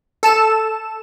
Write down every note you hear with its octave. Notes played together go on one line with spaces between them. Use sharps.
A4 A5 E7